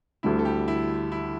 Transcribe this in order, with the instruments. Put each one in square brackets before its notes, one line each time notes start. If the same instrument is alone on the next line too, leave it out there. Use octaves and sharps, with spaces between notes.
[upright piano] D2 D3 G3 [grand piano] E4
[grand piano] A4
G4
E4
E4